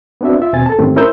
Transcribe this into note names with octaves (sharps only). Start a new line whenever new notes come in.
B3 C4 D4 F#4 E5
F4 E5
D#2 B2 C4 G#5 A6
A4 A5
G#2 D#3 A3 C4 C#4 G4
C#4 E4 A#4 C5 E6 G6